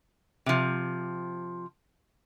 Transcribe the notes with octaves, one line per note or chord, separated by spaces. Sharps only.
C3 F3